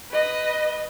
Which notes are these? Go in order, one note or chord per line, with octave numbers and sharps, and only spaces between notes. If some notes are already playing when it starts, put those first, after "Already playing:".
B4 D#5